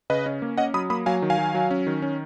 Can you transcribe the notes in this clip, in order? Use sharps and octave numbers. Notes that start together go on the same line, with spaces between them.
C#3 B4 D#5
C#4
A#3
C#4 D#5 F#5
F#3 B5 D#6
A#3 B5 D#6
F#3 F5 G#5
D#3
F5 G#5
F#3
F#3
C#4
D#3
C#4